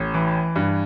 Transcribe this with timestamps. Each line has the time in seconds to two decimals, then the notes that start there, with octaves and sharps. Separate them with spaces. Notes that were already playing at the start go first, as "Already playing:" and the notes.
Already playing: A1
0.14 E3
0.56 G2